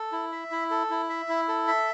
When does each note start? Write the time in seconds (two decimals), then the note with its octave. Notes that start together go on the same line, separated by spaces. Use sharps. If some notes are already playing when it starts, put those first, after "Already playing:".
Already playing: A4
0.12 E4
0.32 E5
0.52 E4
0.70 A4
0.90 E4
1.10 E5
1.29 E4
1.48 A4
1.68 E5